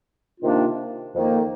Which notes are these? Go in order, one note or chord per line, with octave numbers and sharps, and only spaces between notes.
C3 D#3 A#3 D4 F4
F2 D#3 A#3 D#4